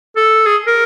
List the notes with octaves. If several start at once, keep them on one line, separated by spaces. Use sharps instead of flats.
A4
G#4
A#4